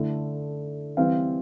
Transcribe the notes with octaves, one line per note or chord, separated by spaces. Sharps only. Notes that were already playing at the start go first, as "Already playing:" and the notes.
Already playing: D3 A3 E4
E3 G3 C4 F5